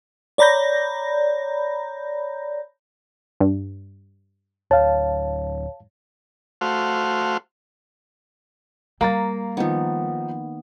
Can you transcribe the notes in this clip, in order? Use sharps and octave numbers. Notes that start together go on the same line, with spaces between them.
C#5 D5 A#5 B5 G6 A#6
G2
D1 C#5 F5 A5
A3 F#4 C5 F5
G3 A#3 F5 A#5 A6
D#3 F3 B3 D#4